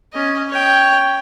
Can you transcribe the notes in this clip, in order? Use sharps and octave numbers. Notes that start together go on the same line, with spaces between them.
C#4 D#5
C#5 G5